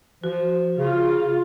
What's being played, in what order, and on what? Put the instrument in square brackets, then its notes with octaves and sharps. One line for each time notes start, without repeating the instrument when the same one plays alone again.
[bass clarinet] F3 [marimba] F#4
[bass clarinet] C#3 [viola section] F4